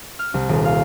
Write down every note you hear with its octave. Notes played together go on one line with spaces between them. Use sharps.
F6
C2
D#1
F5